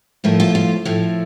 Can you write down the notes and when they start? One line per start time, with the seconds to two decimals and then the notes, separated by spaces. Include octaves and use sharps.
0.24 A2 F3 A3 A#4
0.40 F4
0.55 F4
0.85 A2 F3 A3